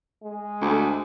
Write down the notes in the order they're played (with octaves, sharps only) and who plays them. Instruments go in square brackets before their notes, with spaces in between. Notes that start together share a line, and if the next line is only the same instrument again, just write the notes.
[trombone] G#3
[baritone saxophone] D2